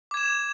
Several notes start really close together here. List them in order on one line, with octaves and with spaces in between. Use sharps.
D6 G#6 E7